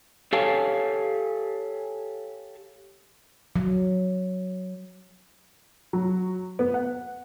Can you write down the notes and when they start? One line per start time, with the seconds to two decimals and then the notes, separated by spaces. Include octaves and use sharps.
0.33 G4 A4 C#5 F5 G#5 A5
3.56 F#3
5.93 F#3
6.59 B3
6.74 F#5